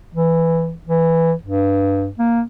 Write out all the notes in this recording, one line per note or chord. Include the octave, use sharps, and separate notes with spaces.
E3
E3
G2
A#3